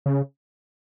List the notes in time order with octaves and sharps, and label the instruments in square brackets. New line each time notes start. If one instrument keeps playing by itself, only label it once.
[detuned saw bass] C#3